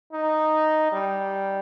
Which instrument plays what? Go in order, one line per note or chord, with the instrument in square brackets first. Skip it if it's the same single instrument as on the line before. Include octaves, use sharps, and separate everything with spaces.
[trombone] D#4
G3